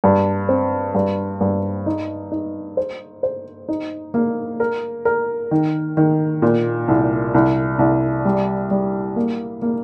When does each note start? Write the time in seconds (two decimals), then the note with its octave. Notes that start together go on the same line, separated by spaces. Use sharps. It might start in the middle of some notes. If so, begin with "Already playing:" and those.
0.04 G2
0.49 C4
0.95 G2
1.41 G2
1.86 D#4
2.32 D#4
2.77 C5
3.23 C5
3.68 D#4
4.14 A#3
4.60 A#4
5.05 A#4
5.51 D#3
5.97 D#3
6.42 A#2
6.88 C2
7.34 C2
7.79 C2
8.25 G3
8.71 G3
9.16 A#3
9.62 A#3